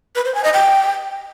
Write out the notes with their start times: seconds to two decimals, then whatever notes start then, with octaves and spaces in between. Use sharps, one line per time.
0.16 B4
0.25 C5
0.35 G#5
0.44 D#5
0.53 G5